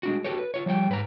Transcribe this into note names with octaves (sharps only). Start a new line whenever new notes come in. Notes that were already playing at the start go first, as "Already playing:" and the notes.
G#3 D4 F#4
F#4 G4 A4 B4 C#5
B4
F4 C#5
F3 G3 C#5 G5
G#2 B4 A5 A#5